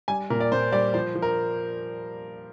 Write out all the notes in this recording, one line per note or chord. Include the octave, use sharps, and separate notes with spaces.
G3 G#5
A#2 A#4
D5
A#2 C5
G3 D5
F3 C5
F3
A#4